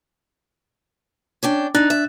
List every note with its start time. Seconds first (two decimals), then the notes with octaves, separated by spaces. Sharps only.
1.43 C#4 D4 G5
1.75 D4 D#4 F#6 A6
1.90 E5